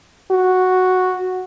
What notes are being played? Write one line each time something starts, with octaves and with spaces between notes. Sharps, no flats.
F#4